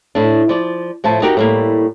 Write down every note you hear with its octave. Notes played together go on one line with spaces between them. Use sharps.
A2 D4
F3 D5
A2 F3 A3 A5
D#4 F#4 G4 A#4 F#5
A2 G3 A#3